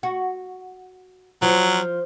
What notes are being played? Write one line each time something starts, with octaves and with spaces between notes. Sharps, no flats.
F#4
F3 F#3